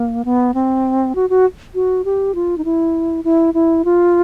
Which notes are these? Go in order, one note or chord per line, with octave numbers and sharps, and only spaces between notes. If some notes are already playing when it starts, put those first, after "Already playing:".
Already playing: A#3
B3
C4
F#4
F#4
F#4
G4
F4
D#4
E4
E4
E4
F4